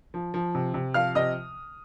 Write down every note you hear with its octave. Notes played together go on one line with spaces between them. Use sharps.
F3
F3
C3
C3
F3 F5 F6
C3 D#5 D#6